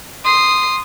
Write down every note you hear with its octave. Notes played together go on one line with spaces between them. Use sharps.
C6 D#6 C7